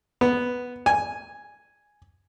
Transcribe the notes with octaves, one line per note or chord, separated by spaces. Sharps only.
B3
G#5